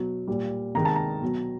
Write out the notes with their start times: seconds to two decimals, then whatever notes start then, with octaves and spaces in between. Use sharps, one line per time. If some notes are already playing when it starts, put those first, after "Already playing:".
Already playing: B2 F#3
0.28 A#2 G3
0.75 C3 D#3 G#3 A#5
0.85 A5
0.95 A#5
1.22 B2 F#3